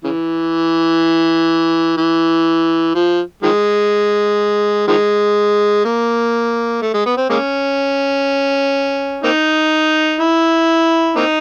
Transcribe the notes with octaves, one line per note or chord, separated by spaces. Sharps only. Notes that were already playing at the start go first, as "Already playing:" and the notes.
C#3 E3
E3
F3
D#3 F3 G#3
D#3 F3 G#3
A#3
A3
G#3
B3
C4
G#3 A#3 C#4
A#3 C4 D#4
E4
A#3 C4 D#4